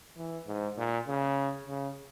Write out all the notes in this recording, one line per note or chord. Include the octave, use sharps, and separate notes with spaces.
E3
G#2
A#2
C#3
C#3